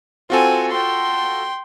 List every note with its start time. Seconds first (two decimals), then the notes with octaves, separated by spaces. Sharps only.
0.30 C4 F4 F#4 A4 G#5
0.71 G5 C6